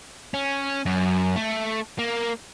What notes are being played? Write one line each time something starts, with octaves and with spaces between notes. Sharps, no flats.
C#4
F#2
A3
A#3